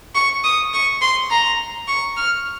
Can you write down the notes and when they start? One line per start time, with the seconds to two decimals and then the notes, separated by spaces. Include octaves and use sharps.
0.15 C#6
0.44 D#6
0.73 C#6
1.02 C6
1.30 A#5
1.88 C#6
2.17 F6